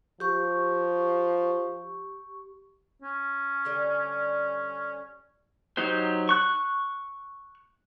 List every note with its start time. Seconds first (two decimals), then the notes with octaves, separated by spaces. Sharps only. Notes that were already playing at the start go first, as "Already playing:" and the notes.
0.20 F3 G4 C#6
3.02 C#4
3.65 D3 G3
5.77 F#3 D#4 G4 C5
6.29 C#6 F#6